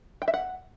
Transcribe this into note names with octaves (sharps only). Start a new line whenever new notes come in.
G5
E5
F#5